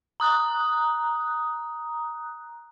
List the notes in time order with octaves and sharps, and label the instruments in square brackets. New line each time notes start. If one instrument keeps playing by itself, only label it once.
[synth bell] A#5 D#6 F#6